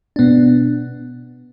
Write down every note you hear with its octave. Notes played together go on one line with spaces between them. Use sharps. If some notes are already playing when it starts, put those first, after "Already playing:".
B2 B3 D4